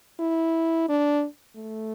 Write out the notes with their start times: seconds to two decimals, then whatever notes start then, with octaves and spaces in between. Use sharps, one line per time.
0.20 E4
0.88 D4
1.57 A3